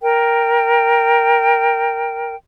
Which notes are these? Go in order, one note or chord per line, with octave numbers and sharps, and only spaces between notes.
A#4 G5